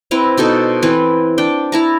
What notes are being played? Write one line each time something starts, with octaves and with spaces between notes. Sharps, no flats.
C4 E4 B4 A#5
B2 D#4 A4 C5
E3 C4 B4
D4 G5
E4 A5 A#5